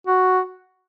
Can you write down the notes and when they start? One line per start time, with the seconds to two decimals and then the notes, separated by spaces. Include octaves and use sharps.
0.07 F#4